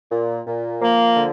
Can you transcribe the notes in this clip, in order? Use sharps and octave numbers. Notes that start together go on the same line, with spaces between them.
A#2
A#2
F3 A#3
D3